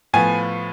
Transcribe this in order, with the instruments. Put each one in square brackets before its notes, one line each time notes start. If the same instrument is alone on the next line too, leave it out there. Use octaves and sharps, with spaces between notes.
[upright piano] A2 F3 B3 G#5